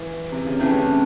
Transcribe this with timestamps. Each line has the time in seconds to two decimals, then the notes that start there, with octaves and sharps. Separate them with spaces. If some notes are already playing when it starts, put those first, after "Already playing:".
Already playing: E3
0.32 C3
0.46 C#3
0.59 C3 E3 A3 D4 G4
0.73 C#3